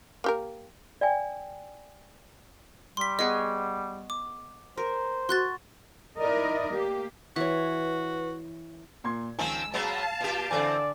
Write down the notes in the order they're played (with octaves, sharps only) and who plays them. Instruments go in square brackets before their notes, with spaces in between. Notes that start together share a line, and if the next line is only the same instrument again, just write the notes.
[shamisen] A#3 G4 A#4
[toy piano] D5 G5 G#5
[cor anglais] G3 [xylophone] C6 B6
[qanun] B3 G#4 C#6 [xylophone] D#5
[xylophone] D6
[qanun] A#4 [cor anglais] C5
[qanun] F#4 [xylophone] C6 F#6 A6
[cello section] D#4 E4 A#4 D5 D#5
A#3 G4
[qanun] E3 C#5 [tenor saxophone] F#4 [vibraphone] B4
[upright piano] A#2 C6 G#6
[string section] C#2 E6 [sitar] D#3 F3 C4 [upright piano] G#5
[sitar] F#3 G#3 B3 [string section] F5 A5
[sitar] A#2 G4
[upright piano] D3 A4 G#5 [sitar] E3 C4 [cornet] D5